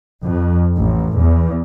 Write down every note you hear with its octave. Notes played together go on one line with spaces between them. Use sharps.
F2
A1
E2